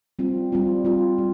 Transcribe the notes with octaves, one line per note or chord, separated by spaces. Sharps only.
G3 C4 F4
G3 C4 F4
G3 C4 F4
G3